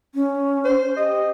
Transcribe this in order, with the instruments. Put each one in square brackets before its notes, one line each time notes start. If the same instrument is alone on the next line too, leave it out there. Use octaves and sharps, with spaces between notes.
[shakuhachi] C#4
[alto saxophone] C5
[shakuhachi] G4 [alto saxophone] D#5